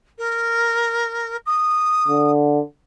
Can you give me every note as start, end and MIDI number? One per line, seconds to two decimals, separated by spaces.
0.18 1.37 70
1.46 2.31 87
2.08 2.60 50